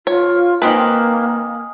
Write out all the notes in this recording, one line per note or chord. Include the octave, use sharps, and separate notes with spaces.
F4 C#5
D#3 A#3 C4 B4 G#5 D#6